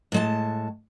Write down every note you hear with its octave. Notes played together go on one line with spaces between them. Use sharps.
A2 G#3 A5